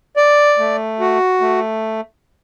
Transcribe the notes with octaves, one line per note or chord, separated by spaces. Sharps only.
D5
A3
F#4
A3